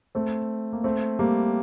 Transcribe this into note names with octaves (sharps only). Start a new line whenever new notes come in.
A3 C4
A#3
A3 C4
G3 A#3